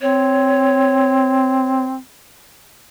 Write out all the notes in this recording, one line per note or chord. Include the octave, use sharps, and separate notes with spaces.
C4 C#5